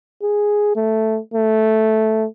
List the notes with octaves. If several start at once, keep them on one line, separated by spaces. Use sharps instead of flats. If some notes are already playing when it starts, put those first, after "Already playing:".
G#4
A3
A3